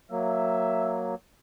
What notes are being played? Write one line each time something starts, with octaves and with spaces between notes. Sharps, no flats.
F#3 A#3 E5